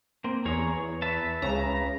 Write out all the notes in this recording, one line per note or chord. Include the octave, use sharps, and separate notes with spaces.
A#3 C4
E2 G#4 C#5 A#5
B4 E5 A5
C#2 C#3 A#5